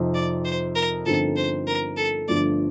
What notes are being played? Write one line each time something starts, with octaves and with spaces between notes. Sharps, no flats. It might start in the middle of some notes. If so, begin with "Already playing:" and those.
Already playing: F2 C3 F3 C4 D#4
D5
C5
A#4
G1 G2 F3 C4 D#4 A4
C5
A#4
A4
G1 G2 F3 A3 D4 D5